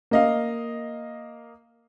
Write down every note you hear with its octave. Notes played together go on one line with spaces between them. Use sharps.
A#3 D#5 F5